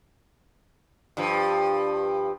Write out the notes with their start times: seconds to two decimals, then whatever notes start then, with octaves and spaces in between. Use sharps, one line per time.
1.17 G2 F3